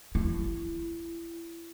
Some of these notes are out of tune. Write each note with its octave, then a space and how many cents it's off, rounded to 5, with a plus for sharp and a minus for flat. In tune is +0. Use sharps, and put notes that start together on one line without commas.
E4 +25